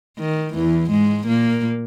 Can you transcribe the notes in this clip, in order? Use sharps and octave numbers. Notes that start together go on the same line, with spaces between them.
D#3
E2 E3
G#2 G#3
A#2 A#3